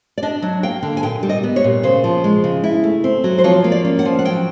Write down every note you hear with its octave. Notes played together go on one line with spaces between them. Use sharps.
D5
D4 D#5
F#3
A#3 G5
D3
G#5
A#2 G5
G3
D#5
B3
C#5
A#2
C#3 C5
F3
G#3
C#3
E4
A3
C4
F#3
C5
F3 C#5
A#3
D5
C#4
F#5
F3
F#5
F#3 G5